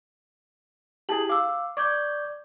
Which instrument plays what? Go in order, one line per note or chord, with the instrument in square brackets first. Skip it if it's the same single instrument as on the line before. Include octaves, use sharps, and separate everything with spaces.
[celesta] E4 A5 F#7 [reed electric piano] G4 G#4
[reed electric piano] F5 [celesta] D6 E6
[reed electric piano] D5 G6 [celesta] C#6 D6 G#6